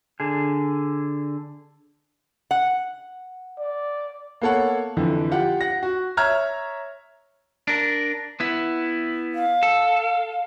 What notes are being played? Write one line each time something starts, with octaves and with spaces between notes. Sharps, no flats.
D3 G#4
F#5
D5
A#3 B3 A4 C#5 F#5
F2 D3 E3
F4 G4 F#5
F#5 A#6
F#4
C#5 E5 A#5 F6 G#6
D4 A#4
B3 E4
F5
A4